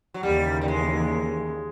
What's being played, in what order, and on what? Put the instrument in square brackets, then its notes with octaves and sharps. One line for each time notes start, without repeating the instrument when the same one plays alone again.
[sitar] F#3
[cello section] D#2 C#3 E3 [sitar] G3
[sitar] G3
G#3